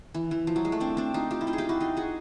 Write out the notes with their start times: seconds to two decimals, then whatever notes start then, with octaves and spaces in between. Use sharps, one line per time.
0.14 E3
0.31 E3
0.47 F3
0.56 F#3
0.65 G#3
0.72 A3
0.80 C4 D4
0.97 C4 D4
1.14 D#4 F4
1.31 F4 G4
1.41 E4
1.47 D#4 F4
1.53 G#4
1.58 F4 G4
1.69 E4 F#4
1.80 D#4 F4
1.97 F#4 G#4